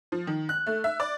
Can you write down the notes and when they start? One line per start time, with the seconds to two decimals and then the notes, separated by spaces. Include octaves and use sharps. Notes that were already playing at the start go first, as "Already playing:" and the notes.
0.12 F3
0.27 D#3
0.49 F#6
0.66 A3
0.84 E5
1.00 D5